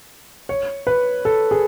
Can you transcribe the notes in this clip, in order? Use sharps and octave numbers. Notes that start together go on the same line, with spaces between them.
C#5
B4
A4
G#4